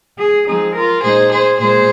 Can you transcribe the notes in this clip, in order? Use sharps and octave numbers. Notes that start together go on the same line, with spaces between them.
G#4
F3 G#3 C4 D#4 G#4
F4 A#4
A#2 G#3 D#4 G#4 C5
G#4 C5
A#2 G#3 G#4 C5